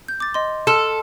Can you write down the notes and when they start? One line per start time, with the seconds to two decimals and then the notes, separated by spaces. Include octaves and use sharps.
0.08 G6
0.20 D6 A6
0.34 D#5 C6
0.67 A4 C6 E6 F6